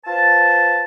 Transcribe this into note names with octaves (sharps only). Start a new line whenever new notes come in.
F4 B4 C5 A5